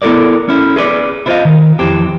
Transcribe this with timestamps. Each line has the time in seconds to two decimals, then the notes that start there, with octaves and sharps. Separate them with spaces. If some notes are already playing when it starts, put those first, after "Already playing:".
0.02 B3 E4 A4 A#4 D5
0.49 C#4 E4
0.76 G#4 B4 C5 D5
1.26 E4 F4 C5 D5 D#5 F5
1.45 D#3
1.79 F2 E3 C4 G4